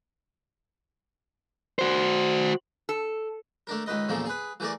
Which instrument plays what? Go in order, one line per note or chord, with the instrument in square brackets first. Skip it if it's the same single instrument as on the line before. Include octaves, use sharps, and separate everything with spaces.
[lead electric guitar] F#4 C5
[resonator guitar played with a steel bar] A4
[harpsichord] A3 D4 A#4
C#2 D#3 B4 D#5
E2 A#2 C#3 F3 A3 A#3
G#4 B4
E3 A3 G#4 A#4 D5